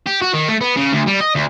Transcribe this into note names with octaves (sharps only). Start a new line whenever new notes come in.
G4
F#4
D#3
A3
B3
C#3
D2
G3
D#5
D2